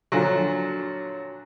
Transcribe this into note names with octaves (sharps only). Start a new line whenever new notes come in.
A#2 D3 F3 F#3